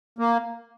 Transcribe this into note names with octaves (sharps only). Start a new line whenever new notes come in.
A#3